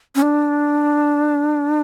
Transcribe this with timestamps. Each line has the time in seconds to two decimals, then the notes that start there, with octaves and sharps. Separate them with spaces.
0.15 C#4
0.22 D4